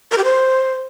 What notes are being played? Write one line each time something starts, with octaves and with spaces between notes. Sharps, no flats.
A#4
G4
C5